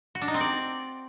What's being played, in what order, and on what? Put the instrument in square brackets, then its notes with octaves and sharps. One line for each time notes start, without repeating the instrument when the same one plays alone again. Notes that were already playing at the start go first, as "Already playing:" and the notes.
[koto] F#4
D4
D#4
C4
D5